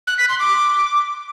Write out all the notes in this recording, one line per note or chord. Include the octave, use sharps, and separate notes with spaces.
F#6
B6
C6
D6